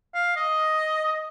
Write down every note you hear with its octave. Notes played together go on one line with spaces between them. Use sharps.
F5
D#5